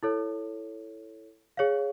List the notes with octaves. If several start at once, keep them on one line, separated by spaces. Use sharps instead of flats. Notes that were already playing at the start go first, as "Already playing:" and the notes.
E4 A4 C#5
G#4 C#5 F5